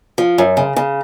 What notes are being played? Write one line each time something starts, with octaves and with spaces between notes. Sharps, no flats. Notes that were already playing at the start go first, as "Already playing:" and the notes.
F3
F#2
C#3
C#3